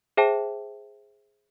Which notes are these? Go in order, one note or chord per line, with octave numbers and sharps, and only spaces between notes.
G#4 C5 E5 G5 A5